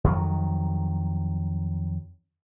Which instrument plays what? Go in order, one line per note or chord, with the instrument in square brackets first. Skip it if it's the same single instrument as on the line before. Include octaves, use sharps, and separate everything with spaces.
[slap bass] F2 D#3 F#3